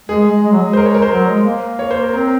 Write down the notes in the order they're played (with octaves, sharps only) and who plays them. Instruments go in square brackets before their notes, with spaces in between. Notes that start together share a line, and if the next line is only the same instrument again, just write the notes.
[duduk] G#3 [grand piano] G#4
[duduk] G#3
G#3
F#3
G#3
[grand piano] C5
A#4
C#5
A#4
C5
[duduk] F#3 [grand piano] A#4
[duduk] G#3
A#3
[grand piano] C#5
C5
A#4
[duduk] C4 [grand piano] A#4